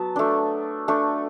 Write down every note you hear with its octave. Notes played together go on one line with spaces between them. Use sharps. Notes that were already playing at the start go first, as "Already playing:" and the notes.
Already playing: F#3 B3 A5
A3 D4
A3 D4